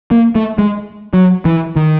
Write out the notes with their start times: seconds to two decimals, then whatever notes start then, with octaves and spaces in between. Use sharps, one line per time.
0.11 A#3
0.35 A3
0.59 G#3
1.14 F#3
1.45 E3
1.76 D#3